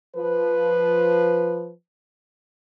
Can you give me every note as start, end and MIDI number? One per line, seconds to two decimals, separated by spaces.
0.16 1.71 53
0.16 1.71 71